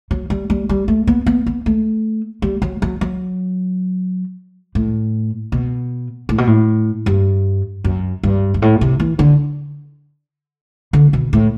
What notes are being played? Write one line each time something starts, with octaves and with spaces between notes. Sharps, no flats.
F#3
G3
G3
G3
A3
B3
B3
B3
A3
G3
F#3
F#3
F#3
A2
B2
A2
B2
A2
G2
F#2
G2
G2
A2
C3
E3
D3
D3
B2
A2